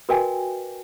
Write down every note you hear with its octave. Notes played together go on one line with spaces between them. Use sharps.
F#4 A#4 B4 D#5 G5 G#5